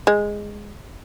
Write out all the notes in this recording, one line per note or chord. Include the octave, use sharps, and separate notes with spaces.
G#3